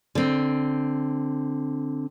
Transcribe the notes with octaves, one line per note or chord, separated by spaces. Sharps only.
D3 C4